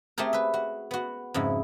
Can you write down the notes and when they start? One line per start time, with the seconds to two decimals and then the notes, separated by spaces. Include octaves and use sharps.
0.18 A3 C4 G4 G#4 A#4
0.33 B4 E5
0.54 F#4
0.91 B3 F#4
1.34 F2 G#2 C#3 E4